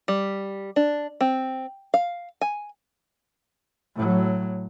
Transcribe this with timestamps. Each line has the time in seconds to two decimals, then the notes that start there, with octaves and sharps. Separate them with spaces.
0.08 G3
0.76 D4
1.21 C4
1.94 F5
2.41 G#5
3.96 A2 F#3